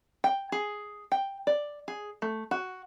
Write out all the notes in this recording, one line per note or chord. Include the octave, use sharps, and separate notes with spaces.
G5
G#4
G5
D5
G#4
A3
F#4